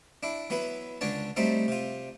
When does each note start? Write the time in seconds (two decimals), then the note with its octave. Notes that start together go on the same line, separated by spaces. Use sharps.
0.23 D4 E4
0.50 F#3 B3 E4 B4
1.01 C#2 D3 D4 C#5 A5
1.36 F#3 G3 A3 C4 D#4
1.68 C3 F4